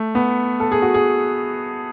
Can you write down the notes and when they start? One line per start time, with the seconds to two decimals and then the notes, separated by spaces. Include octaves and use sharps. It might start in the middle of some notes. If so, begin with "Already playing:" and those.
Already playing: A3
0.15 B3
0.60 A4
0.72 G#4
0.82 F#4
0.94 G#4